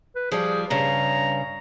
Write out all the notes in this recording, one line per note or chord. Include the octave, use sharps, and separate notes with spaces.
B4
F3 G3 G#4
G2 C#3 A#5